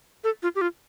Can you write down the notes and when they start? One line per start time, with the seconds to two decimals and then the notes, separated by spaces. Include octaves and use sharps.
0.24 A4
0.43 F4
0.55 G4
0.61 F4